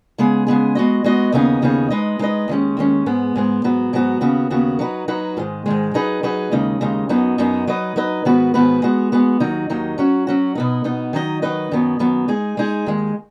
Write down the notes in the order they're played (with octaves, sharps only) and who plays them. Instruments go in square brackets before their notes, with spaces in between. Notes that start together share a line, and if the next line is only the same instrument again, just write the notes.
[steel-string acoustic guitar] C#3 G#3 B3 G#4
C#3 G#3 B3 G#4
G#3 B3 F#4 D#5
G#3 B3 F#4 D#5
D#2 C#3 B3 D#4 G#4
D#2 C#3 B3 D#4 G#4
G#3 D#4 B4 D#5
G#3 D#4 B4 D#5
D#2 D#3 G#3 C#4
D#2 D#3 G#3 C#4
G#2 G#3 B3
G#2 G#3 B3
G#2 F#3 B3 F#4
G#2 F#3 B3 F#4
D#2 C#3 B3 F#4
D#2 C#3 B3 F#4
F#3 D#4 F#4 B4
F#3 D#4 F#4 B4
G#2 D#3 G#3
G#2 D#3 G#3
F#3 D#4 G#4 B4
F#3 D#4 G#4 B4
D#2 C#3 G#3 D#4
D#2 C#3 G#3 D#4
F#2 F#3 B3 D#4
F#2 F#3 B3 D#4
F#3 D#4 B4 D#5
F#3 D#4 B4 D#5
G#2 D#3 B3 F#4 B4
G#2 D#3 B3 F#4 B4
G#3 B3 F#4
G#3 B3 F#4
D#2 D#3 F#3 D#4
D#2 D#3 F#3 D#4
F#3 C#4 F#4
F#3 C#4 F#4
B2 B3 D#4
B2 B3 D#4
D#3 F#3 D#4 B4 D#5
D#3 F#3 D#4 B4 D#5
F#2 D#3 F#3 B3
F#2 D#3 F#3 B3
G#3 D#4 G#4
G#3 D#4 G#4
D#2 D#3 G#3